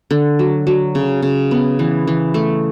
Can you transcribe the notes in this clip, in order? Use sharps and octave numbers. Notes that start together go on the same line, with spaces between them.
D3
F#3
F#3
C#3
C#3
B3
E3
E3
A3